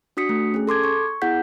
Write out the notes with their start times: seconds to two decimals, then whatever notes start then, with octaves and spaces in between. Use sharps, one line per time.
0.17 D4 F#4 D#6 B6 C#7
0.29 A3
0.54 C#4 G#4
0.67 A4 C6 D6 G#6
0.84 C#6
1.22 B3 E4 G#4 F#5 G6 B6